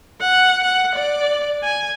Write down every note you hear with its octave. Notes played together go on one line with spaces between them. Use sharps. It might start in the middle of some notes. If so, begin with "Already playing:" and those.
F#5
F#5
D5
G#5